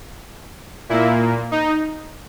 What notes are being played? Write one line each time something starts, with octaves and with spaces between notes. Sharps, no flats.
A#2 A#3 E4
D#4